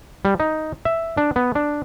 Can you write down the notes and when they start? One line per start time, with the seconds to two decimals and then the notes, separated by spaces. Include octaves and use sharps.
0.25 G3
0.40 D#4
0.85 E5
1.17 D4
1.36 B3
1.55 D4